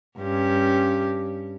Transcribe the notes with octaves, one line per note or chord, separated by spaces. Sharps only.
G2 C#4 G4